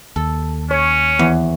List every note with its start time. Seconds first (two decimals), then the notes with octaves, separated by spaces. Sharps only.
0.16 D#2 A4
0.71 C#4 C#5
1.19 E2 B3